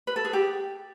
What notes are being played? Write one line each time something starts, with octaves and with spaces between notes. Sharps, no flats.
B4
A4
G#4
G4